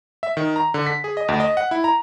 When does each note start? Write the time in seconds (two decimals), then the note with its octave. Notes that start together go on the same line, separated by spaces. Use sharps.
0.23 E5
0.37 D#3
0.56 A#5
0.74 D3
0.86 B6
1.04 G#4
1.17 D#5
1.28 D2
1.40 D#5
1.57 F#5
1.71 E4
1.84 A#5